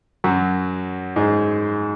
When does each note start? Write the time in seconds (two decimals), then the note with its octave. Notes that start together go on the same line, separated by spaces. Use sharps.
0.24 F#2 F#3
1.16 G#2 G#3